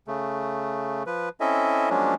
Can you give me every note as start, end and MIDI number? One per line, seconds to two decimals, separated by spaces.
0.07 1.03 49
0.07 1.03 57
1.07 1.29 53
1.07 1.29 71
1.40 1.90 60
1.40 1.90 61
1.40 1.90 64
1.40 1.90 69
1.40 1.90 75
1.40 1.90 76
1.90 2.14 53
1.90 2.14 54
1.90 2.14 56
1.90 2.14 58
1.90 2.14 61
1.90 2.14 62